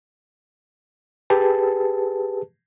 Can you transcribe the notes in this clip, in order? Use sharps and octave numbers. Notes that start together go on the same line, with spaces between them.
G4 G#4 B4 A5